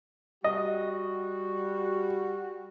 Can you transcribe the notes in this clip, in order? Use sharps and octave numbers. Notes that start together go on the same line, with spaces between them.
G3 F#4 D#5